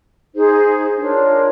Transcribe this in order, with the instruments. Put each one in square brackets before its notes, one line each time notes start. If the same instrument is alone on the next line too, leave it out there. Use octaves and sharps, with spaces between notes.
[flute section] D#4 G#4 C5
D4 F4 A#4 C#5